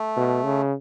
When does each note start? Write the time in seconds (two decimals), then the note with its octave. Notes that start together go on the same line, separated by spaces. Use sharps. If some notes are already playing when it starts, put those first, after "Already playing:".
Already playing: A3
0.16 B2
0.44 C#3